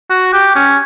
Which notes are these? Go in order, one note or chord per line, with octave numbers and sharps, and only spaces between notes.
F#4
G4
C#4